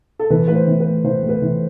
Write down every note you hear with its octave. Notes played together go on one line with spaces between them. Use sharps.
A4
E3 B4
A2 B4
C5
E3
B4
A2
E3 C5
A2
B4
E3